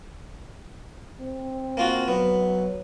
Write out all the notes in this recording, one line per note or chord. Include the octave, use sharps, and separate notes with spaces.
C4
A#3 F4 F#4
F#3 B3